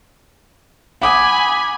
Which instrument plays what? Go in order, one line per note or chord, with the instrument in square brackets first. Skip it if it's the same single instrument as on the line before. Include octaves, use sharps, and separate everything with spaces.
[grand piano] F#5 D6 D#6 [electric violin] G#5 B5